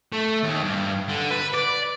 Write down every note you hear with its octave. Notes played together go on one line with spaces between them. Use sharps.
A3
D#2
G2
D3
B4
D5